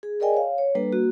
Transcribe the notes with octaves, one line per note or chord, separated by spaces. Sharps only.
G#4
G#4 A#4 D5 D#5 G5 G#5
C#5 F5
C#5
G3 A#3 D4 A4 B4
A#3 F#4